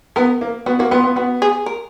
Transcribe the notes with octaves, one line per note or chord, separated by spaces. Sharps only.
B3 A#4
A#3
B3 F#4
A#3 F#4
B3 F4
B3
B3 F#4
G#4
A#4